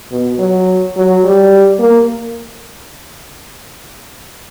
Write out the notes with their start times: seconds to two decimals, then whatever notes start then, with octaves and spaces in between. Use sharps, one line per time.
0.11 B2
0.39 F#3
0.96 F#3
1.24 G3
1.79 A#3